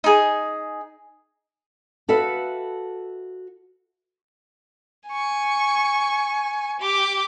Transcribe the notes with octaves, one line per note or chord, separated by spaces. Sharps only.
D#4 G#4
F#4 A4 B4 E5 F5
G#5 C#6
G4 D6